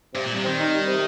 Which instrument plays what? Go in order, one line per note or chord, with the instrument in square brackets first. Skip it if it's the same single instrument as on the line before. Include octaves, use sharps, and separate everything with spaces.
[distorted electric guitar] G2 [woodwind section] C3
[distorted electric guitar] A#2
[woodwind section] G3
[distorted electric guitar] C3
[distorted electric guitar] D#3 [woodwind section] C4
[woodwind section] D#4
G3
C3